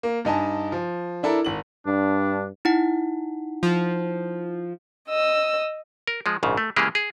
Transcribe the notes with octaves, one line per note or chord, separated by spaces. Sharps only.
A#3
G2 D#4 G#5 A5
F3
D4 E4 A4 A#4
G#1 F#7
G2 D4
D#4 E4 F#5
F3
D#5 E6
A#4
F3 G#3
A#1 G#2 C#3
A3
C#3 E3 G#3 A#3 G4 G#4
G#4